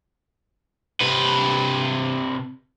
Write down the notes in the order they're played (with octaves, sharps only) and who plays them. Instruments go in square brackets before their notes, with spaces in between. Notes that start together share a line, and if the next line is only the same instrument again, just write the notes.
[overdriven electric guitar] C3 B4